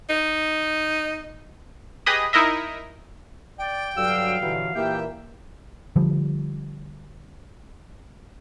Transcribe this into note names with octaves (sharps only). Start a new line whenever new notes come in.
D#4
G4 G#4 B4 D#5 B5 D#6
D#4 E4 A#4 D#5 E5
D5 G5
G2 D3 F#3 F#4 F5 E6
G2 A#2 D3 E3 F#3
A#2 E3 A#3 G4 E5 G5
D3 F3 G3